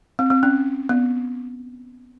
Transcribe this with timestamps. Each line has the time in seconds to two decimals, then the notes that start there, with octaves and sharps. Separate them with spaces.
0.19 C4
0.30 C4
0.43 C#4
0.89 B3